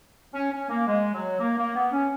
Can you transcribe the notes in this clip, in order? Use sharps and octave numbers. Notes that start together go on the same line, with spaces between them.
C#4
C#4
A#3
G#3
F#3
A#3
A#3
B3
C#4